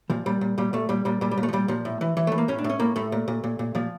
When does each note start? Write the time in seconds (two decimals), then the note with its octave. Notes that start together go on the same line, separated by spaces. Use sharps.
0.10 A#2 F3
0.26 A#2 G3
0.41 A#2
0.58 A#2 G3
0.73 A#2 A3
0.89 A#2 G3
1.05 A#2 G3
1.21 A#2 G3
1.31 G3
1.37 A#2
1.43 A3
1.48 F3
1.53 A#2 G3
1.68 A#2 F3
1.85 A2
2.01 E3
2.17 E3
2.27 E3 A3
2.38 A#3
2.48 A2 C#4
2.58 D4
2.64 A2
2.69 C#4
2.79 A2 A#3
2.96 A2 A3
3.12 A#2
3.28 A#2
3.44 A#2
3.59 A#2
3.75 A#2 F3